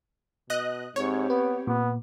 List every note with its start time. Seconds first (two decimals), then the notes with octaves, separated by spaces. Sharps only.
0.50 B2 D#5 F#6
0.96 G#2 C4 G4 C#5
1.30 B3 B4
1.67 A#2 B3